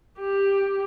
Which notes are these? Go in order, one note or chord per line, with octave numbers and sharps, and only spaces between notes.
G4